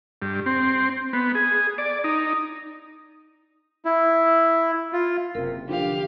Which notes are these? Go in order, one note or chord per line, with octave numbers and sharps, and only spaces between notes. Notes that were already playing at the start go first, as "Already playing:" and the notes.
G2
C4
B3
G#4
D5
D#4
E4
F4
F#1 C3 A#4
D3 F3 G4 F5